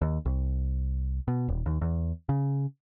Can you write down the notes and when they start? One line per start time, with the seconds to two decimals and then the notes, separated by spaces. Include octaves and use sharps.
0.02 D#2
0.25 C2
1.28 B2
1.48 D#1
1.66 D#2
1.81 E2
2.29 C#3